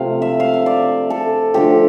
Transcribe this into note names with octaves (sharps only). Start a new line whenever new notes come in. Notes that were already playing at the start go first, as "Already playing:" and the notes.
Already playing: C3 F3 A3 F5
E5
F5
E5
D5
A4
D3 F3 A3 G4